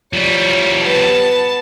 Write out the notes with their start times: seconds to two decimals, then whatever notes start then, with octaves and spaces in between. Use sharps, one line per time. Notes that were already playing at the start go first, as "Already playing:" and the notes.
0.13 F3 G3 C#5
0.82 B3 A5